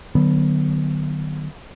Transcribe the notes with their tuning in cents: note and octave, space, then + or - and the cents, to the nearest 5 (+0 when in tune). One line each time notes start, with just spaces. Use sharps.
D#3 -45 F#3 +15 B3 +0